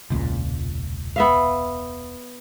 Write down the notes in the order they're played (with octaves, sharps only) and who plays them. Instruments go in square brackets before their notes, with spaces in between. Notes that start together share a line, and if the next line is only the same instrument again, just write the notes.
[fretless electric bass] E1 C#2 A#2
[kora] B3 E5 F5